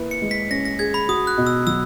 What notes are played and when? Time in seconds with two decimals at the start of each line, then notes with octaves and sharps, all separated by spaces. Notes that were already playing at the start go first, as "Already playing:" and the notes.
Already playing: A#3 E4 B4
0.11 C#7
0.21 G#3
0.31 B6
0.50 C#4 A#6
0.65 A#6
0.79 G#4 G#6
0.94 B5
1.08 F#4 D#6
1.27 F#6
1.38 B2
1.47 E6
1.66 F#3 E6